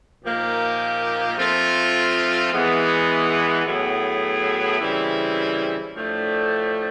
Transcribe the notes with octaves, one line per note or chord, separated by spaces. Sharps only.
A#2 F3 A#3 D#4 G4
F3 A3 C4 F4
E3 G#3 B3
A2 F#3 B3 E4 G#4
C#3 E3 G3 C4 E4
A2 F3 A3 D4